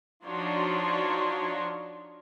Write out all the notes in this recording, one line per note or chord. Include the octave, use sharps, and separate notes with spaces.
F3 D4 D#4 F#4 C#5 C6